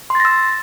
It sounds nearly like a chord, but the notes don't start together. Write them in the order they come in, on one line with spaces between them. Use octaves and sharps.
C6 A6 A#6 E6